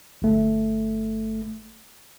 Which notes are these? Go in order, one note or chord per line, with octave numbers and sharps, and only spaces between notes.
G1 A3